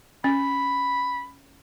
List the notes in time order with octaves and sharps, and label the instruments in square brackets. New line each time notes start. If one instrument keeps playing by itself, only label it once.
[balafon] C#4 [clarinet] B5